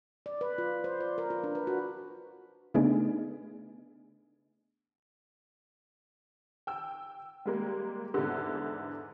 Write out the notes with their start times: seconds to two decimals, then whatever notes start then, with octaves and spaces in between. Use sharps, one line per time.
0.26 D5
0.41 B4
0.58 F4
0.84 C5
1.01 D5
1.18 A#4
1.30 F4
1.44 D4
1.55 B4
1.67 F#4
2.74 C#3 A3 B3 D4 D#4 G#4
6.67 G5 E6
7.46 G3 G#3 A#3
8.14 E2 G#2 D3